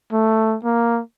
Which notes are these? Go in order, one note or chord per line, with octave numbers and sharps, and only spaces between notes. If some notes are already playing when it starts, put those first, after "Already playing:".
A3
A#3